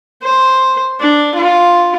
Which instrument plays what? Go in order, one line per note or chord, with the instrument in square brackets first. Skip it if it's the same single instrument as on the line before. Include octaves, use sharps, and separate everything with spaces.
[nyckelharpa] C5
D4
F4